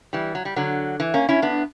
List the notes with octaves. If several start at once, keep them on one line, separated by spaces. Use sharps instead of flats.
E3 G3
F#3
G3
D3 F#3
E3
A#3 C#4
C#4 E4
B3 D4